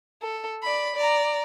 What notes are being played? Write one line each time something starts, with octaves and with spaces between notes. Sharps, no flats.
A4
D5 B5
D5 A#5